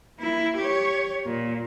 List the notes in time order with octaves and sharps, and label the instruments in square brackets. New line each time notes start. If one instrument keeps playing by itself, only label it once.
[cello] A#3 E4
G4 C#5
A#2